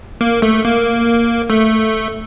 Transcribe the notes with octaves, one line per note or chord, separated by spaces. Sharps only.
A#3
A3
A#3
A3